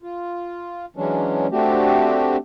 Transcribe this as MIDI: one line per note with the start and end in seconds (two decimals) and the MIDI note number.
0.03 0.86 65
0.96 1.47 52
0.96 1.47 54
0.96 1.47 56
0.96 1.47 61
0.96 1.47 62
1.52 2.37 57
1.52 2.37 60
1.52 2.37 62
1.52 2.37 66
1.52 2.37 67